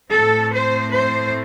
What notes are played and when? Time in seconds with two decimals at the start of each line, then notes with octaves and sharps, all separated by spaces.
0.11 A2 A3 C4 A4
0.52 C5
0.92 C5